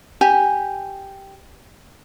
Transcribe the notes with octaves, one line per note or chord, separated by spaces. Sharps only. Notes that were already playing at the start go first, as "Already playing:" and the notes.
G4 G#5